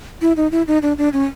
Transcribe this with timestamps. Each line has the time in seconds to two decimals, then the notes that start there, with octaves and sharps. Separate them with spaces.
0.22 E4
0.37 D#4
0.52 E4
0.67 D#4
0.82 D4
0.98 D4
1.13 C#4